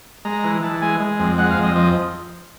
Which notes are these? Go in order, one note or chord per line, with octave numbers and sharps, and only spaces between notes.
G#3 A#5
E3
E3 A5
G#3 G#5
G#3
F2
G#3 F#5
F5
F2
D#5
F3 D#5